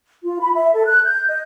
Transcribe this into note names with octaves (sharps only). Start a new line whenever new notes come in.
F4
B5
E5
A4
F#6
G6
D#5